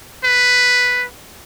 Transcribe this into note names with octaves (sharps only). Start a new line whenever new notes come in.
B4